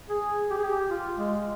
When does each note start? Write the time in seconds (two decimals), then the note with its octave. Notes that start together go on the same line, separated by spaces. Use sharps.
0.09 G#4
0.51 G4
0.57 G#4
0.64 G4
0.90 F4
1.18 G#3